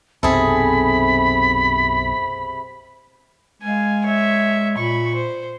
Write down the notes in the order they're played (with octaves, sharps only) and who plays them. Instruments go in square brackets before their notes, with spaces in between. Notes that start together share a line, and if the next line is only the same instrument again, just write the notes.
[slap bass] B1 F#2 [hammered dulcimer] C3 [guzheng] G#4 A4 [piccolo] B5
[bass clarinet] G#3 [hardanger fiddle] F5 G#5
[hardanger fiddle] C#5 E5
[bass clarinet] A#2 [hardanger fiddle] B5 C#6
[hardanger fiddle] C5